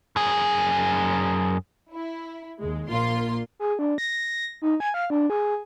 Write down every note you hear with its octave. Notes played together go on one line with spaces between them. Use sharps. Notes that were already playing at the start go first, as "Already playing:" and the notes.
F#2 G#4
E4
D#2 G#3
A#1 A#2 A#3 F4 C6
G#4
D4
A#6
D#4
G#5
F5
D4
G#4